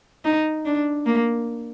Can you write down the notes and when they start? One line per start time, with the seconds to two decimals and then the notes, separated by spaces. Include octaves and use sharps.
0.25 D#4
0.65 D4
1.06 A#3